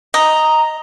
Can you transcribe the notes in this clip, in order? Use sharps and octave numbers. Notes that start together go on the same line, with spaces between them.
D#5 A#5